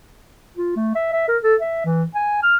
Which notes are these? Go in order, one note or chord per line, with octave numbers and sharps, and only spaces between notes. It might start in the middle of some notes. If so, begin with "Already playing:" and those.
F4
A3
E5
E5
A#4
A4
E5
E3
G#5
F6